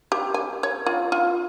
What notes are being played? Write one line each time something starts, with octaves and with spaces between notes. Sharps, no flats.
G4
G#5
C#5
F4
F4